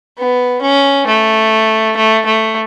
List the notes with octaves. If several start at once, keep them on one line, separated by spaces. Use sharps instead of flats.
B3
C#4
A3
A3
A3